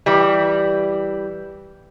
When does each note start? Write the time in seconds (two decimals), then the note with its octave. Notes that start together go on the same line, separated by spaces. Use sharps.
0.06 E3 G3